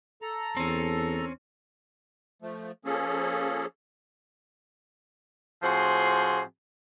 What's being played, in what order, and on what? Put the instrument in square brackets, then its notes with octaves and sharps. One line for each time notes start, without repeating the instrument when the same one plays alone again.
[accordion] A4 A#5
[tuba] E2 [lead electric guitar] C4 C#4
[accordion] F3 A3
F3 A#3 C#4 G#4 A4
[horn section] A2 F3 C4 F#4 G#4 C6